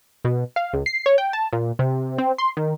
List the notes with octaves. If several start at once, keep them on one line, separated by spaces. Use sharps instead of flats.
B2
F5
C#2
C7
C#5
G5
A5
A#2
C3
C4
C6
D#3